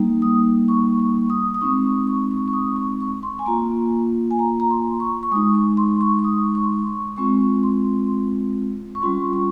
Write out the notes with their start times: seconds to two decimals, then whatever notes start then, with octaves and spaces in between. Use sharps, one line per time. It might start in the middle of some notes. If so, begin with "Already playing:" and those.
Already playing: G3 A#3 D#4
0.22 D#6
0.68 C#6
1.00 C#6
1.30 D#6
1.54 D#6
1.61 G#3 C4 D#4 C#6
1.84 D#6
2.07 C#6
2.31 C#6
2.48 C#6
2.53 D#6
2.76 C#6
3.00 C#6
3.23 C6
3.39 G#5
3.46 A#3 F4 A#5
4.31 G#5
4.39 A#5
4.60 A#5
4.70 C6
5.00 C#6
5.23 C#6
5.31 G#3 D#6
5.36 D#4
5.55 C#6
5.77 C6
6.01 C#6
6.19 C#6
6.24 D#6
6.55 C#6
6.64 C6
6.73 C#6
7.16 G#3 C4 F4 C#6
7.63 C6
8.95 C#6
9.02 G3 C#4 F4 C6
9.33 C#6